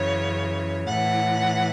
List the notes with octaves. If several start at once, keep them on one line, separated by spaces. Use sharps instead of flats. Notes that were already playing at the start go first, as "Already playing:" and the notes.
Already playing: F#2 C#3 E3 C#5
A2 E3 F#5